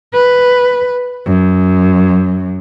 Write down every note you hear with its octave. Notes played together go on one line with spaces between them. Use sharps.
B4
F#2